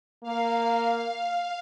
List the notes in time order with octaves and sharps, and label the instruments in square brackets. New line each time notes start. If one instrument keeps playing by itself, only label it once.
[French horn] A#3 [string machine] F5